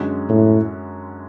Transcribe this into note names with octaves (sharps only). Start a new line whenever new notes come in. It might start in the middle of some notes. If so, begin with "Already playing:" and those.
Already playing: F#2 D3 G#3 C#4 F#4
A2